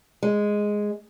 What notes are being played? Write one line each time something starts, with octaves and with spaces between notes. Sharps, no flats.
G#3